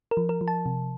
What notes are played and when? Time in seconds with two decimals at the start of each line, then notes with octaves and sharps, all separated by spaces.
0.11 A#4
0.17 F3
0.29 A#4
0.41 F3
0.48 A5
0.66 C3